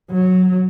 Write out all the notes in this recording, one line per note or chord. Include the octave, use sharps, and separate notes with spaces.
F#3